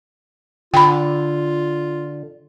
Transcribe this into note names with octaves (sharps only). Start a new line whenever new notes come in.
D3 F4 G5 B5